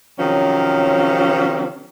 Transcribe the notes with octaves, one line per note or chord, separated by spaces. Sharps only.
C3 D#3 F3 F#3 C4 C#4